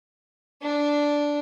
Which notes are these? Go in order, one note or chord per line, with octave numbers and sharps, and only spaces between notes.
D4